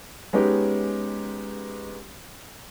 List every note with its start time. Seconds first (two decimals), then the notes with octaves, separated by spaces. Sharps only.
0.33 G#3 B3 C#4 D#4 G4